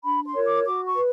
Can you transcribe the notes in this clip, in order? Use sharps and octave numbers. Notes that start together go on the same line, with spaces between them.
D4 B5
C6
F4 A#4 C#5
D6
F#4 D6
C#6
B4